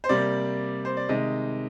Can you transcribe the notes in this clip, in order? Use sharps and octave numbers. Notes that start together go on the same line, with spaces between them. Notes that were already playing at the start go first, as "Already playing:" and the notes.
C5
C3 G3 A#3 D5
C5
D5
C3 D#3 G#3 D#5